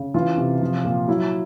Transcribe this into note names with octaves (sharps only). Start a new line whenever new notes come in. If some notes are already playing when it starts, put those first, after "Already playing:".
Already playing: C#3
E3 F4
C3
F3
A#2
F#3 E4